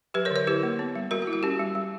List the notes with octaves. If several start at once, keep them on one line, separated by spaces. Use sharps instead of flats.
F#3 G4 B4
A#4 C#5
D3
A#4 C#5
E4 G4 B4
A#3
B3
G3
G3 F#4 A#4
F#4
E4
F#4
C#4 G4
G3
G3